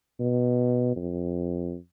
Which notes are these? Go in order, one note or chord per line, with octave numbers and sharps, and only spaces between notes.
B2
F2